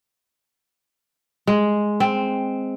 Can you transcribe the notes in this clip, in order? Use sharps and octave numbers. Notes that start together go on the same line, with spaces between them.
G#3
C4